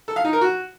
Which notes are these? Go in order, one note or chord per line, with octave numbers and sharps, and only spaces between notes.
A4
F5
D#4
A#4
F#4